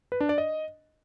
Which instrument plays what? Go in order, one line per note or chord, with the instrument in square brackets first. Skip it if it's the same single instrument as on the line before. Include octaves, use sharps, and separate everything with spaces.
[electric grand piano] B4
D4
D5
D#5